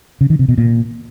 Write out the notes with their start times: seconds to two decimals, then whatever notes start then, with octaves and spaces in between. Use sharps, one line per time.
0.21 C#3
0.30 D#3
0.39 C3
0.49 B2
0.58 A#2